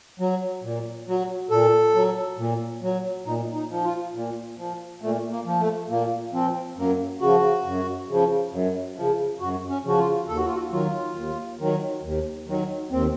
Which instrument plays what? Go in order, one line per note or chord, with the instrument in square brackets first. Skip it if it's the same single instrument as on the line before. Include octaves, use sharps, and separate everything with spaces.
[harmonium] F#3
A#2
F#3
A#2 A4
F#3
A#2
F#3
A#2 D#4
D#4
F3
F4
A#2
F3
A#2 A3
A#3
F3
A3
A#2 A#3
F3 C4
F#2 A#3
C#3 F3 F#4
F#2
C#3 F3
F#2
C#3 F3
F#2 F#4
C#4
C#3 F3 F#4
F4
D#2 A4
F#4
F4
F#4
D#3 F#3 F4
D#2
D#3 F#3
D#2
D#3 F#3
D#2 C4